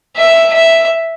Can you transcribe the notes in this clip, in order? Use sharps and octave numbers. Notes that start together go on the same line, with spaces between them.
E5
E5